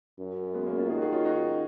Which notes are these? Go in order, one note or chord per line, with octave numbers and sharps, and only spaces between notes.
F#2
G#3 B3
A#3 C#4
C#4 F4
D#3 F4 G#4
F#4
F4 G#4
C#4 F4
D#4 F#4